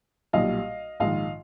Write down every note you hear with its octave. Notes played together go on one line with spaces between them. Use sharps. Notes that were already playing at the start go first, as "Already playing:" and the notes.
B1 A#2 G3 D#5 F5
A#1 G#2 D#3 D#5 F5